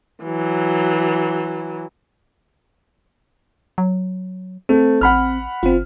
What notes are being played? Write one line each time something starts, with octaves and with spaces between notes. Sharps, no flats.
E3 F#3
F#3
A3 C4
A1 F#5 B5 F6
G1 C4 F4